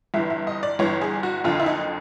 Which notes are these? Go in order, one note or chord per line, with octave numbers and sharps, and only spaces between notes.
G1 G2 E3 E5
E5
D#5
D5
G1 G2 E3 C#5
G#4
F#4
F#1 F2 D3 F4
E4
D#4